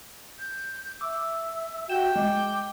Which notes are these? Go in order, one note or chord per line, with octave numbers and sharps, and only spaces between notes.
G6
E5 D6 E6
F#4 G4 E5 G5 G6 E7
G#3 D6